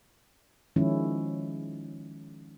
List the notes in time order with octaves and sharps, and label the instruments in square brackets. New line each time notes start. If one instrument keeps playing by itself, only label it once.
[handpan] D#3 F3 G#3 C#4 E4